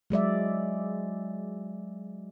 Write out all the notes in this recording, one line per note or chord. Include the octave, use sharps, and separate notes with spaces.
F#3 G#3 D5 E5